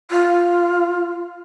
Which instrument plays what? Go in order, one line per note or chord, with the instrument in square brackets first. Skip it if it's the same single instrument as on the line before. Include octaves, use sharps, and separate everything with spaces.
[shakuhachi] F4